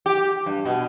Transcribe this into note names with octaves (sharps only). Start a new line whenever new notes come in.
G4
G2
B2